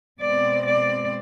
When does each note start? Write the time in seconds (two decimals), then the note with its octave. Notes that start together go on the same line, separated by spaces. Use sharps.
0.20 B2 G#3 C4 D5
0.67 D5